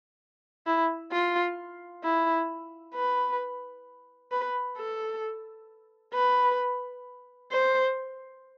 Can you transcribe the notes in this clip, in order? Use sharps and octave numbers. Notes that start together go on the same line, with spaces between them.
E4
F4
E4
B4
B4
A4
B4
C5